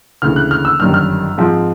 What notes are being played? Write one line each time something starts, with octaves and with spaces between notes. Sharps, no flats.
D2 C#3 E3 F6
F#6
F6
E6
G1 F#2 D#3 G3 F6
F6
G#2 F3 G#3 C4